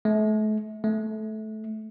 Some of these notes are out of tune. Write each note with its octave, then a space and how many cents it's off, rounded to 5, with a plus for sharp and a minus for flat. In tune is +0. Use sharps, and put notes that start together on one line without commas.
A3 -40
A3 -20